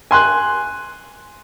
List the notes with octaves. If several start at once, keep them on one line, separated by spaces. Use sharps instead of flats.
G#5 C6 F#6